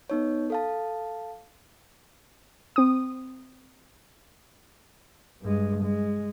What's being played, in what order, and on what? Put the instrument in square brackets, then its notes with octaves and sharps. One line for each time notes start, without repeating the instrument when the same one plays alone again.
[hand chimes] B3 D#4 C#5
A4 F5 A5
[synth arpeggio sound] C4 D#6
[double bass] G2 G#3
G#3